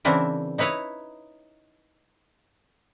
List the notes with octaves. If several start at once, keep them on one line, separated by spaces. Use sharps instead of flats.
C#3 E3 C4 D4 E4 A#4
D#4 E4 B4 C#5 D#5